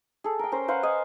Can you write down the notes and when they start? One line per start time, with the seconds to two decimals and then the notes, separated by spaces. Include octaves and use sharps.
0.24 G#4 A4
0.39 A#4 G5
0.52 C#4 A#4 C5
0.68 B4 C5 F5 F#5
0.83 D#5 F5 G#5